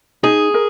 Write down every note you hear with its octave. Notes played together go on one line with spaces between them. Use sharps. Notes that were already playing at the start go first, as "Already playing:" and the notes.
D#4 G#4
A#4